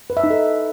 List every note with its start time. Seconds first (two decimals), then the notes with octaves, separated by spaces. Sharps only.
0.10 B4
0.17 E5
0.24 D#4
0.30 A4